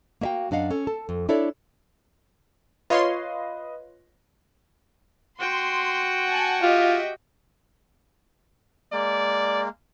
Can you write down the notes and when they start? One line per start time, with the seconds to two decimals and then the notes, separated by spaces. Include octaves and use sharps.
0.21 A#3 F#4 E5 F5 G5
0.51 F#2 D4 D#5 F5 F#5
0.71 C#4 A4
0.87 A4 A5
1.09 F2
1.29 D4 E4 A4 C#5 D5
2.90 F4 B4 C#5 D#5 F5 C6
5.39 F#4 G5 C6
6.26 F#5 G#5 A5
6.63 F4 G4 D#5 E5
8.93 G#3 A#3 D5